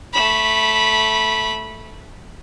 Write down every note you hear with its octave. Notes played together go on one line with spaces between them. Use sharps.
A3 B5